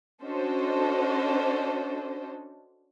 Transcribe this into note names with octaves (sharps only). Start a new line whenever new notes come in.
C#4 D4 F#4 A4 C5 D#5